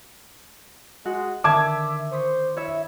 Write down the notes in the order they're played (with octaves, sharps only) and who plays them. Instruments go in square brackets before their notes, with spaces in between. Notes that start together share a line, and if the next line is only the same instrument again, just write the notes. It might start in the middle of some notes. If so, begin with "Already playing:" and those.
[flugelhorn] G#3 [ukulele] F#4
[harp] D3 D#3 [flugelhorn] E5 [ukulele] A5 [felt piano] D6 G#6
[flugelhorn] C5 [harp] C#6 D#6 B6
[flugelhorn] E4 [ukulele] C#5 E5 [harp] D#5